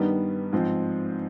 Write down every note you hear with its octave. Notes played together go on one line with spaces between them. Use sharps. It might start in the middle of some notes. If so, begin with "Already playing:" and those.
Already playing: G2 D#3 G3 B3 D#4
G#2 F3 C4